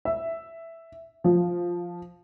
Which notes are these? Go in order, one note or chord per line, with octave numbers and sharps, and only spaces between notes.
E5
F3